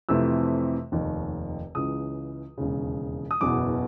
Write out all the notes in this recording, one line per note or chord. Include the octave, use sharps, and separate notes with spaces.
F2 C3 E3 A3 E6
F1 D#2 D#3
C#2 C#3 E3 D#6
E1 D#2 C#3
D#6
F#1 E2 B2 D6